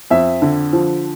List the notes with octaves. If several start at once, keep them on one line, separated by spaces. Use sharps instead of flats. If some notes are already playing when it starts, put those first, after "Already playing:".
F2 E5
D3
F3